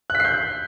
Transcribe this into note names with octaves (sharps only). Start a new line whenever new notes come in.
F#6
B6
C7
G6